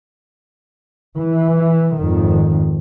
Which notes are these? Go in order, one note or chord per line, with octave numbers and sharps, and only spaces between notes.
E3
G#1 F2 D#3